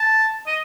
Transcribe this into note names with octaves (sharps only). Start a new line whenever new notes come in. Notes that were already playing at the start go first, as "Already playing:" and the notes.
Already playing: A5
D#5